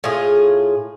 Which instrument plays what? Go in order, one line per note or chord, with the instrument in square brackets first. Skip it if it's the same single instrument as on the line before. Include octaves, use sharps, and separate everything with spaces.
[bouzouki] A2 F4 G#4